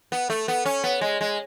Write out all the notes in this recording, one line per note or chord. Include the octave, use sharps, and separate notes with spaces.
B3
A3
B3
C#4
B3
G#3
G#3